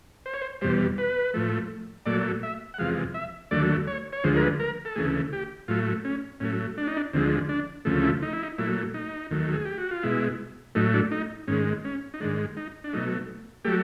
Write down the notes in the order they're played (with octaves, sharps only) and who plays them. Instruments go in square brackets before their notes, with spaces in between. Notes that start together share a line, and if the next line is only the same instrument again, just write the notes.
[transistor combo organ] C5
C#5
C5
E2 B2 G3 C5
B4
A2 F3 A3
A#2 F#3 A3 D5
E5
F#5
E2 C3 F3 G#3 F5
E5
D#2 D3 F#3 A3 D5
C#5
C#5
D2 D3 F3 G#3 C5
A#4
B4
A#4
A4
D2 C#3 E3 A3 G#4
G4
A2 F#3 A3 F4
C#4
A2 F#3 A3 C#4
D4
D#4
D4
D2 D3 F3 G#3 C4
D4
D2 C#3 F3 A3
E4
D#4
E4
D#4
A#2 F#3 A3 E4
D#4
D#2 D#3 F#3 A3
G#4
G4
F#4
F4
B2 G#3 E4
A2 F#3 A3 D#4
D4
D#4
G#2 D#3 G#3 C#4
C#4
D#4
G#2 D#3 G#3 D4
D#4
D4
B2 F#3 A3 D#4
F#3 A3 G4